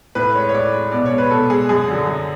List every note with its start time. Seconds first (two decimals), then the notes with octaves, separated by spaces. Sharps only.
0.15 A2 B4
0.35 G#3 C#5
0.49 C#5
0.54 A2 D5
0.73 G#3
0.92 B2 D5
1.06 C#5
1.12 G#3
1.18 B4
1.31 B2 A4
1.50 G#3 G#4
1.69 F#2 G#4
1.88 D3 F#3
2.07 F#2